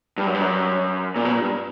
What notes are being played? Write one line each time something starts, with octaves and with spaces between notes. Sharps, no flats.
G2
F#2
G2
F#2
A#2
B2
A#2
G2